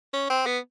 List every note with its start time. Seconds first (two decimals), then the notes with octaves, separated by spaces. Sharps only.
0.13 C#4
0.30 C4
0.46 B3